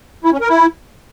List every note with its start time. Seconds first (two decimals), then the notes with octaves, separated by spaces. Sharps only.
0.24 E4
0.33 C#4
0.41 A#4
0.49 E4